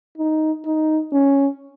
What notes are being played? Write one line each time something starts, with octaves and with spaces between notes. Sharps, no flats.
D#4
D#4
C#4